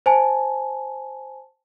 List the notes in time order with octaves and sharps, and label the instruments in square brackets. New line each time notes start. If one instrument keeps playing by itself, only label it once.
[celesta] C5 G#5 A5